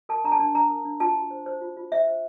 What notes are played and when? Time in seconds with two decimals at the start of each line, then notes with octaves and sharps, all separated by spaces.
0.09 A#4 A5
0.24 D4 A#5
0.32 A5
0.39 D4
0.55 D4 A#5
0.70 A#4
0.85 D4
1.00 F4 A5
1.16 F4
1.31 C5
1.46 C5
1.61 F4
1.77 F4
1.92 C5 E5
2.07 C5